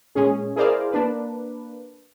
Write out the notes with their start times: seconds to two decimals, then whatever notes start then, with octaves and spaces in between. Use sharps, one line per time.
0.15 A#2 G#3 C#4 G#4
0.56 E4 G#4 A#4 C5 D5 F5
0.92 A#3 D4 B4